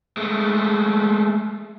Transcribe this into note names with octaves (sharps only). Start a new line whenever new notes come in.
G#3 A3